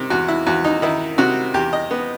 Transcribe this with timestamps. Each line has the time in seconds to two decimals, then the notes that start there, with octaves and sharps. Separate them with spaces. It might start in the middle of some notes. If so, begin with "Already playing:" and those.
Already playing: C3 D#3
0.10 E2 F#4
0.28 E4
0.46 E2 F#4
0.64 D#4
0.82 D#3 E4
1.18 C3 F#4
1.54 E2 G4
1.73 D#5
1.91 B3